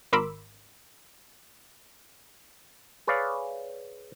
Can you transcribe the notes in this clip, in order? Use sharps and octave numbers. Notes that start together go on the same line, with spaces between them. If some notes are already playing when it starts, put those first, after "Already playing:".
G#1 A#4 B5 C6 D6 E6
G#4 B4 C#5 D5 F5